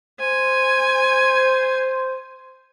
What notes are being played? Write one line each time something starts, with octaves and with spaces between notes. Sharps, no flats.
C5 G#5